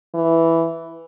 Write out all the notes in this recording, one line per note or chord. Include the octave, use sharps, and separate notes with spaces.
E3